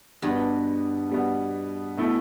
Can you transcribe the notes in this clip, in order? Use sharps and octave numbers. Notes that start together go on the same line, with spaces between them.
G2 B2 G3 B3
B2 G3 B3
B2 A3 E4